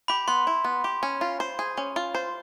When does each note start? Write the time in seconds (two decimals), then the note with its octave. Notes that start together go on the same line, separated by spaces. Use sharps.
0.08 G4 B5
0.28 B3 C6
0.47 E4
0.64 B3
0.84 G4
1.03 C#4
1.21 F4
1.40 C5
1.59 G#4
1.77 C#4
1.96 F4
2.15 C5